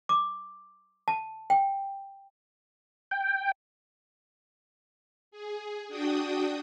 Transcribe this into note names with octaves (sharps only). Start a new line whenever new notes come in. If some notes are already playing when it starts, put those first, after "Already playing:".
D6
A5
G5
G5
G#4
D4 F#4 G5 D#6